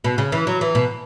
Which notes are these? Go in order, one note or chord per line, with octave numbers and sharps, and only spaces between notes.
B2
C#3
E3
F#3
E3
B2